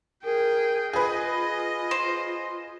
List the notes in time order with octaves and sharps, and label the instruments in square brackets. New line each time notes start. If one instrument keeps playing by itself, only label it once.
[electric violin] G#4 G5 [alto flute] A#4
[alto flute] F4 [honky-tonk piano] G#4 B4 [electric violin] D#5
[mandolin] C5